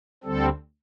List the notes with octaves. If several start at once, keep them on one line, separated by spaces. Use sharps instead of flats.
D2 D3 G3 C4 A4